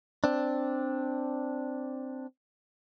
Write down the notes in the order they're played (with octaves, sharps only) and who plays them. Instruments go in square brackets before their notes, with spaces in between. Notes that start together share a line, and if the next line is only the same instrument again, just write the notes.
[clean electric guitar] C4 D4